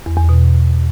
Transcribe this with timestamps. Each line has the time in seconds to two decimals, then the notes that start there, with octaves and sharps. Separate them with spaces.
0.06 E2
0.18 E2
0.29 B2